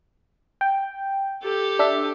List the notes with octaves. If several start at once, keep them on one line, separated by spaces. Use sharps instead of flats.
G5
G4 A4
D4 E5